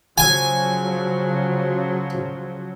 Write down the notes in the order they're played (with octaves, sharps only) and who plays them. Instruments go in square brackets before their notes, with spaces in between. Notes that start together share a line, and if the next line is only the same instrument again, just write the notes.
[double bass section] C#3 F3 F#3 [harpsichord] G#5